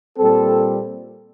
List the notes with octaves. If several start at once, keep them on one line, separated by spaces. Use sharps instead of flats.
A#2 G3 C4 A4